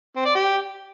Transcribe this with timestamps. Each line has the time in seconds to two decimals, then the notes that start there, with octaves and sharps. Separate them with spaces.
0.16 C4
0.25 D5
0.35 G4